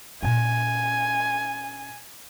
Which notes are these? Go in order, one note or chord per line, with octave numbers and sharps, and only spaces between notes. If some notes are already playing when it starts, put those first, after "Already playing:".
A#2 C#4 G#5